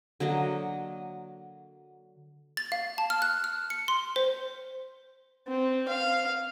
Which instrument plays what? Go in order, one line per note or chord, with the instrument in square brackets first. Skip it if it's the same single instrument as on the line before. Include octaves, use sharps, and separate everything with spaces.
[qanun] D3 F#3 A#3 D#5
[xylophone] A6
F5
A5
F6
F#6
F6
C#7
C6
C5
[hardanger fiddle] C4
F5